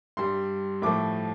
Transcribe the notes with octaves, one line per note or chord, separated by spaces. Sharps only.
G2 G3 C6
A2 F3 A3 D6